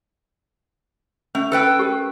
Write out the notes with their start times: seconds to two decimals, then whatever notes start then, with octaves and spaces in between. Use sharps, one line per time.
1.35 A3 C#4
1.52 A4 B4 G5
1.79 G4 A#4